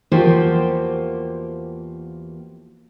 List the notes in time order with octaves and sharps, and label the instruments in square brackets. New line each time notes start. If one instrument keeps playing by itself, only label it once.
[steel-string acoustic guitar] E2 F3 A#3 F#4 G4 C5